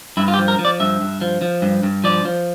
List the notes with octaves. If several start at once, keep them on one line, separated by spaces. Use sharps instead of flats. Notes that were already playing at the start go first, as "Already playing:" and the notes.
G2 E4
F4
G4
F3
A#4
F3
D5
G2 E5
G2
F3
F3
G2
G2
F3 D5
F3